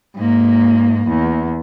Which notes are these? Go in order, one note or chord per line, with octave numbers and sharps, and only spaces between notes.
G#2 A#3
E2